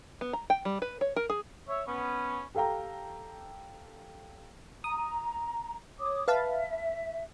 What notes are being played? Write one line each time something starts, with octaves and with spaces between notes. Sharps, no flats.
B3
A#5
G5
G3
B4
C#5
A#4
G#4
C#5 E5
B3 C#4
G4 A4 F5 G5 A#5
A#5 D#6
C#5 D6 D#6
B4 E5 F5 A5